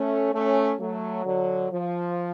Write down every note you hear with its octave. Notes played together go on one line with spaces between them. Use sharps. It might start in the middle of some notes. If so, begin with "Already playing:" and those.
Already playing: A3 C#4
A3 C#4
F#3 A3
D3 F#3
F3